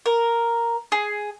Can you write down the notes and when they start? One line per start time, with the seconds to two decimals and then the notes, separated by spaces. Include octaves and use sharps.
0.06 A#4
0.92 G#4